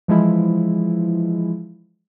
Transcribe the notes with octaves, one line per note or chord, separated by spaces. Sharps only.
E3 F3 G#3 E4